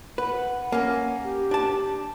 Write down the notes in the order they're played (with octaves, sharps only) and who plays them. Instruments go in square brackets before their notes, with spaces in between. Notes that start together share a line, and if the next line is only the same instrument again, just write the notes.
[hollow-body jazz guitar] B4 [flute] F#5
[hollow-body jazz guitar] A#3 C#4
[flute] G4
[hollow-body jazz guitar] D4 A5